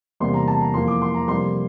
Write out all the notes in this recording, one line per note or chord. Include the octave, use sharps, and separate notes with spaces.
E2 C3 G3 A#3 C6
A#5
A5
A#5
F2 E3 A#3 C6
D6
C6
A#5
F2 C3 G3 A#3 C6